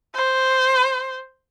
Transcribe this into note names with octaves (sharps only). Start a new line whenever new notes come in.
C5